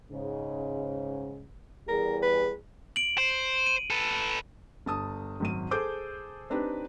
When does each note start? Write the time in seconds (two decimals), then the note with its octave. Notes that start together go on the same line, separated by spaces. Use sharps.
0.11 G#2 C#3
1.88 E2 G3 G#4 A#4
2.23 B4
2.96 D7 F#7
3.18 C5
3.66 D#7
3.90 A4 B4
4.86 G1 A5 D#6
5.40 G#1 F#2 D#7
5.71 G#4 A4 C5 D6 G6
6.50 C4 D4 D#4 G4 B4